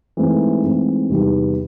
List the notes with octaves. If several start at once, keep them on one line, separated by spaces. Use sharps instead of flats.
G#2 E3 A3 C4
G#2 E3 A3 C4
E2 C3 D#3 G3 B3